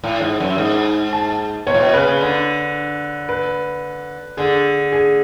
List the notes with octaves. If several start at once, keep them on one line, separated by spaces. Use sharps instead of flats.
A2
G#2
F#2
G#2
A5
B2 C#5
A2
B2
C#3 B4
C#3
D3
B4
D3 G#4
G#4